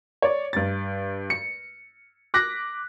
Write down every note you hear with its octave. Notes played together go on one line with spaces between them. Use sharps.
C#5 D5
G2 A6
C#7
D6 F#6 A#6 B6